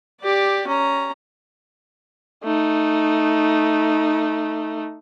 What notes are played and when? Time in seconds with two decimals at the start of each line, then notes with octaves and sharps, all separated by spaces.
0.21 G4 D5
0.67 C#4 A#5
2.44 A3 D#4